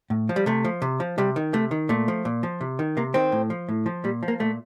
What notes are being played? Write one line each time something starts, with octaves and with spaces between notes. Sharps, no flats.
A2
F3
G3
C3 A3
F3
C3
F3
C3 G3
D#3
C3 A3
D#3
A#2 A3
F3
A#2
F3
C3
D#3
C3 A#3
D#3 C4
A2
F3
A2
F3
A#2 G3
F3
A#3
A#2 A3